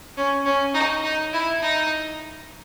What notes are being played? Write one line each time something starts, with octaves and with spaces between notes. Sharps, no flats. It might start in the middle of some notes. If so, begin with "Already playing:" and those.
C#4
C#4
D#4
D#4
E4
D#4